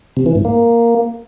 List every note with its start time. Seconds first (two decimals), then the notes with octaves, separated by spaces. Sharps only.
0.17 C3
0.26 E3
0.35 G#2
0.45 A#3